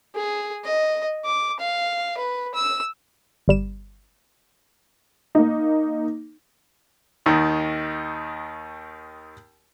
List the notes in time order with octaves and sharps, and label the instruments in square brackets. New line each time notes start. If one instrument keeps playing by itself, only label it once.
[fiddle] G#4
D#5
D6
F5
B4
E6
[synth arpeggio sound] G1 G3 E7
[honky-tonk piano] A#3 D#4
[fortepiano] D#2 D#3